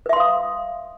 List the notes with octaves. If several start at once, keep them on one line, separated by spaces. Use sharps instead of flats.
B4 E5 F5 C6 D#6